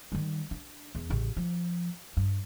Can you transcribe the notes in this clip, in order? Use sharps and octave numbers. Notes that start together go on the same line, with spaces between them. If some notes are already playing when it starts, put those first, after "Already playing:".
D#3 G3
D4
E2
A1 C#3
F3
G2